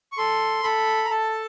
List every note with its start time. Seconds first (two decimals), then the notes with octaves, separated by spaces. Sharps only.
0.12 C#6
0.17 A4 C6
0.63 A4 B5
1.05 A#5
1.10 A4 A5